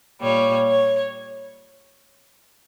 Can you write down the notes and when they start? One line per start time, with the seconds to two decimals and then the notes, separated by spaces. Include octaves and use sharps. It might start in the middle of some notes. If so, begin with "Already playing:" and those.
0.21 A#2 G3 C#5
0.67 C#5